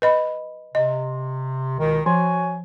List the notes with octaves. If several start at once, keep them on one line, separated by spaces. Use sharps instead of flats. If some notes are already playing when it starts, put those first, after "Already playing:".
B4 D#5 B5
C3 D#5
C#2 B2 D#3
F3 F#4 C#5 G#5